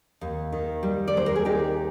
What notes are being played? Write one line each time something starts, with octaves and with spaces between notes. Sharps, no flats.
D#2
D#3
G3
D5
D#2 C5
A#4
G#4
D#2 D#4 G4